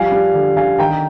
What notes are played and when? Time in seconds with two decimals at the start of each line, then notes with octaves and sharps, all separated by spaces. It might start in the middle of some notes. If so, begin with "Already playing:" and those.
Already playing: F3 G3 F5 G#5
0.12 G3
0.34 D3
0.56 D3 F5 G#5
0.78 D#3 G5 A#5